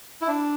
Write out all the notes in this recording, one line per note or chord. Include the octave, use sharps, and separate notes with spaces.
E4
D4